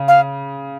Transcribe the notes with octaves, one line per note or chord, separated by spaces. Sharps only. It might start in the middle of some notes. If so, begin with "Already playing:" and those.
Already playing: C#3
F5